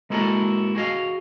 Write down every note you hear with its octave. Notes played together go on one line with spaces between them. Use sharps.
G#3 A#3 E4 F#4 A4 A#4
F#4 G#4 D#5 F5